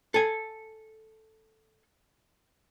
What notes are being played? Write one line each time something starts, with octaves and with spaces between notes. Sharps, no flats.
A4 G#5